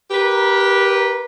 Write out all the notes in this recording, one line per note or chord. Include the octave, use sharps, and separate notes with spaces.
G4 A#4 B4